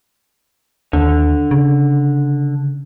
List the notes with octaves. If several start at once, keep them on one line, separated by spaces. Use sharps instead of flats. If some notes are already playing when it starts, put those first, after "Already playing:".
D#2 D3
C#3